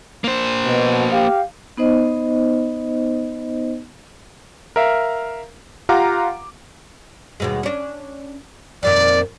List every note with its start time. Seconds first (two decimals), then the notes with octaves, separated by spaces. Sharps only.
0.24 A#3 C5
0.65 B2
1.12 G4 F5
1.77 B3 D#4 C5 D#5
4.76 A#4 E5 F5
5.89 F4 G4 F5 F#5 A#5 D6
7.40 D#2 B2 G#3
7.63 C#4 D4
8.83 F2 A#2 D#3 D5